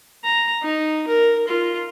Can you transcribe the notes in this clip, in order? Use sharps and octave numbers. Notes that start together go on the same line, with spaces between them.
A#5
D#4
A#4
F4